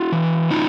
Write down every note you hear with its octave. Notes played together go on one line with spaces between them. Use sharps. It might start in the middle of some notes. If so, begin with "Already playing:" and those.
Already playing: E4 F#4
E3
A2 D#4 F4